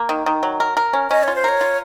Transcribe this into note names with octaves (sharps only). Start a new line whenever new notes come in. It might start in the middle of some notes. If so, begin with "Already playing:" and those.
Already playing: A#3
D#3
D#3
F#3
A#4
A#4
C#4
C#4 D#5
F4 C#5
C5
A#4 C#5
F4